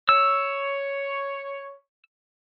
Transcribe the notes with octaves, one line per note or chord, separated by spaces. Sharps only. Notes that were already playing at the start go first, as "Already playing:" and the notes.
C#5 E6